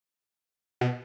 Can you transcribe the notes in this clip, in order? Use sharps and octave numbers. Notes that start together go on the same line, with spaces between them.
B2